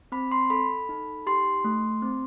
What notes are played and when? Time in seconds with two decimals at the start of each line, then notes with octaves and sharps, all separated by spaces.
0.12 C4 B5
0.32 C6
0.50 A4 B5
0.89 D#4
1.27 G4 C6
1.64 A3
2.02 C4